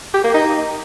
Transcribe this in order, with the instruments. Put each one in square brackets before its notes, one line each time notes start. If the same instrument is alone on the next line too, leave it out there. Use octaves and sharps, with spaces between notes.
[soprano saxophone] G4
A#3
D#4